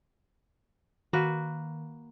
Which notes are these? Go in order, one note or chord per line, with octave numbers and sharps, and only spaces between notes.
D#3 A#3 F#4 B4